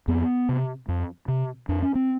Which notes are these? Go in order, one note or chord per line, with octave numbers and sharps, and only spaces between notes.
F2 B3
C3
F2
C3
F2 D4
C#4
C4